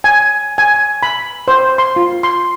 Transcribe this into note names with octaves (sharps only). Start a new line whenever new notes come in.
G#5
G#5
B5
C5
C6
F4
C6